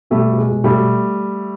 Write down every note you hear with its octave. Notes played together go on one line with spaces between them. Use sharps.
B2 G3 A3
B2
G#3
B2
G3 A3
B2